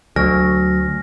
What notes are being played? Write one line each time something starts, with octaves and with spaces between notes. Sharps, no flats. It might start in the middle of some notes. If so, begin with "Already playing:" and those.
D2 F#3 G#5 F6 A#6